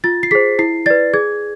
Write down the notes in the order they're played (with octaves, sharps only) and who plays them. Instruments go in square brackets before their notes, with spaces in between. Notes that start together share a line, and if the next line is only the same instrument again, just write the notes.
[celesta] F4 A6
C7
G#4 C5 B6
E4 C7
B4 D5 A6
G#4 G#6